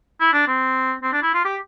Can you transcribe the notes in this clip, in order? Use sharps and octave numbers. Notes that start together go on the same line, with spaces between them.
E4
D4
C4
C4
D4
E4
F4
G4